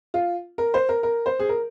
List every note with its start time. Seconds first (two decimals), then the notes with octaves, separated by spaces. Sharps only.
0.14 F4
0.58 A#4
0.74 C5
0.89 A#4
1.03 A#4
1.26 C5
1.39 G#4
1.49 A#4